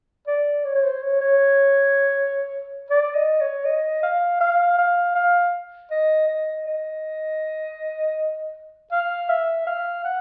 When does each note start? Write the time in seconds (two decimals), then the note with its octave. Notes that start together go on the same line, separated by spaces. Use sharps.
0.27 D5
0.65 C#5
0.75 C#5
0.83 C5
1.02 C#5
1.21 C#5
2.90 D5
3.15 D#5
3.41 C#5
3.65 D#5
4.03 F5
4.40 F5
4.78 F5
5.15 F5
5.91 D#5
6.28 D#5
6.66 D#5
8.92 F5
9.29 E5
9.67 F5
10.04 F#5